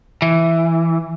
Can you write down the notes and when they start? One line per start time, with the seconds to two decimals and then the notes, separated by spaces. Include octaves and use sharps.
0.22 E3